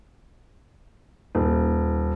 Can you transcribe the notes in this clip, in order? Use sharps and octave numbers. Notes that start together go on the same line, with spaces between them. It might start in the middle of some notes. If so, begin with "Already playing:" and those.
D#1